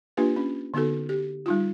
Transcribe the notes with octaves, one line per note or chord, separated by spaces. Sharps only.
A#3 D4 F4 G4 B4
C#4
D3 B3 D#4 F#4 A4
G4
G3 D#4 F4